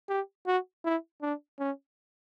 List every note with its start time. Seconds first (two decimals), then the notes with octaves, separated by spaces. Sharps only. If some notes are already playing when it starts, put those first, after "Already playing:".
0.09 G4
0.47 F#4
0.85 E4
1.22 D4
1.59 C#4